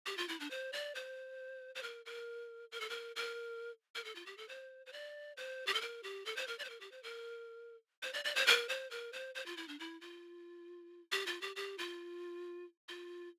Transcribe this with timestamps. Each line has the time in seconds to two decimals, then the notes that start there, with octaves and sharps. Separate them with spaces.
0.06 G4
0.18 F4
0.29 E4
0.40 D4
0.51 C5
0.73 D5
0.95 C5
1.75 C5
1.83 A#4
2.06 A#4
2.72 A#4
2.80 A4
2.90 A#4
3.16 A#4
3.95 A#4
4.04 A4
4.15 F4
4.26 G4
4.37 A4
4.49 C5
4.86 C5
4.93 D5
5.37 C5
5.67 G4
5.74 A4
5.81 A#4
6.03 G4
6.26 A4
6.37 C5
6.48 A#4
6.59 D5
6.65 C5
6.70 A#4
6.81 G4
6.92 C5
7.03 A#4
8.03 C5
8.13 D5
8.25 D5
8.36 C5
8.47 A#4
8.69 C5
8.91 A#4
9.13 C5
9.35 C5
9.46 F4
9.57 E4
9.68 D4
9.79 E4
10.01 F4
11.12 G4
11.27 F4
11.42 G4
11.56 G4
11.78 F4
12.89 F4